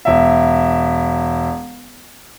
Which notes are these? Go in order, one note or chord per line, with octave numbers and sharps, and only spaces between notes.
E1 E5